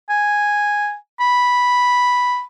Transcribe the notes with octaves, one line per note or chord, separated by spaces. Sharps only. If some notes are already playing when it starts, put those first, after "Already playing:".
G#5
B5